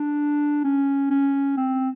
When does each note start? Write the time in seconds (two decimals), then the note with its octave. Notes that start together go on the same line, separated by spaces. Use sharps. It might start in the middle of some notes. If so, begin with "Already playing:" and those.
Already playing: D4
0.64 C#4
1.10 C#4
1.57 C4